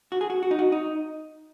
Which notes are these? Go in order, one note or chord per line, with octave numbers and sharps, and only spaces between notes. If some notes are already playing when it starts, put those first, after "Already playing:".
F#4
G#4
F#4
F#4
D#4
F#4
D#4